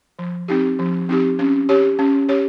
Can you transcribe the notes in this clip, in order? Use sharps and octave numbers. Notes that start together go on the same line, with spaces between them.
F3
C4 D#4 G4
F3
C4 D#4 G4
C#4
G4 C#5
C#4
G4 C#5